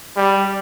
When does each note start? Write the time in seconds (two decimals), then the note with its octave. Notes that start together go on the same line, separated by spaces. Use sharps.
0.17 G3